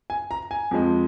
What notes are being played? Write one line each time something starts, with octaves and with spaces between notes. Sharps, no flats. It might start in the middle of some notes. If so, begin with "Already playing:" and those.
G#5
A#5
G#5
F2 F3 G#3